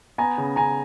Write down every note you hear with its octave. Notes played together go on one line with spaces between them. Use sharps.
B3 G#5 A#5
C#3
C#3 G#5 A#5